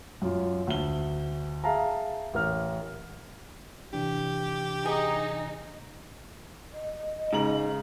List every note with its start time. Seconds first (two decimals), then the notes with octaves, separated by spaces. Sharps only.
0.22 F#2 F4
0.67 D2 G7
1.64 G#4 E5 F5 A5 A#5
2.34 A1 A#4 F6
3.93 C3 E3 D4 G4
4.85 D#4 G#4
6.74 D#5
7.33 G#2 C#3 A#5 F#7